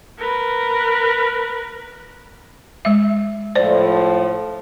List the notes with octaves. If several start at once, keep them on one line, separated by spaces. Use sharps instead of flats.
A#4 B4
G#3 E5
A2 F3 C5 D5